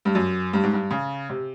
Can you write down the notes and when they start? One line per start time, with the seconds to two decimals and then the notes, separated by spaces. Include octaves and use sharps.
0.05 G2
0.15 F#2
0.53 G2
0.63 G#2
0.73 G2
0.91 C#3
1.29 C3